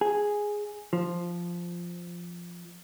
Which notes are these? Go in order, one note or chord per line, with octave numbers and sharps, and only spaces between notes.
G#4
F3